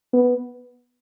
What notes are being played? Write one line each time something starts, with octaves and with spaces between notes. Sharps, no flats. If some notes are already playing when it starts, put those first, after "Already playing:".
B3